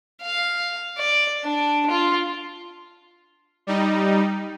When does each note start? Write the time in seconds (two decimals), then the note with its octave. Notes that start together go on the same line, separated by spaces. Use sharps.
0.22 F5
0.98 D5
1.44 D4
1.90 F4
3.67 G3 D#4